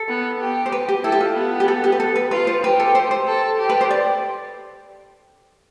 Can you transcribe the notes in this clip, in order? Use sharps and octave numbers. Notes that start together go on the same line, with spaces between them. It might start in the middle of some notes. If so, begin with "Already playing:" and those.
Already playing: A4
B3
G4
C5
B4
G4
E4 A4
G4
F4
B3
G4
A4
G4
B4
A4
B4
F4 B4
C5
G4 B4
A4
C5
C5
A4
G4
B4
C5
D5